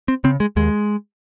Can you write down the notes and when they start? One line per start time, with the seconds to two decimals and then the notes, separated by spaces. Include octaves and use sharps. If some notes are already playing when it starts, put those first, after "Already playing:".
0.08 C4
0.24 C#3 C4
0.40 G#3
0.56 D#2 G#3